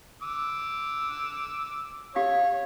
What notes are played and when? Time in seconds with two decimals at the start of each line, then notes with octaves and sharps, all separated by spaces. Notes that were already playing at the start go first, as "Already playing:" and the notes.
0.22 D6 E6
2.15 G4 C#5 F5 D#6